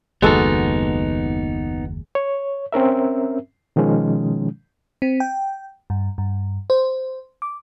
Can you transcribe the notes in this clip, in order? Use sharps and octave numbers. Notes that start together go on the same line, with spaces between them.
F#1 D#2 G#3 B3 D#4 F#4 A4
C#5
C4 C#4 A#4 E5
B2 D#3 F3 G#3 C#4
C4
G5
G2
G2
C5
D6